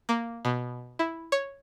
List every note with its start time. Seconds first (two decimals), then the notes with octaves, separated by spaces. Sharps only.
0.09 A#3
0.45 B2
0.99 E4
1.32 C#5